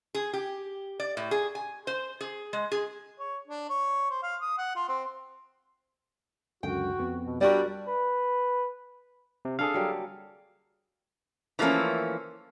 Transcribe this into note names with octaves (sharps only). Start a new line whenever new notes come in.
G#4
G4
D5
A2
G#4
G#5
C5
G#4
G#3
G#4
C#5
D4
C#5
C5
F5
D#6
F#5
F4
C4
C#2 F#2 D3 F#4 G5
F2 B3
B2
G3 D4 F#4 A#4 D5
B4
C3
D3 D4 G#4 A4 F5
F#3 G3 A#3
E3 F3 A3 A#3 C#4